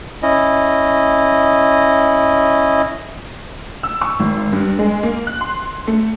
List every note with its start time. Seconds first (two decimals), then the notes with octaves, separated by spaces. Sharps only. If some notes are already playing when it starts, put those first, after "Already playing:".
0.23 C#4 E4 D#5
3.83 E6
4.02 C#6
4.20 G#1
4.52 G2
4.79 G#3
5.03 A#3
5.27 F#6
5.41 C6
5.87 A3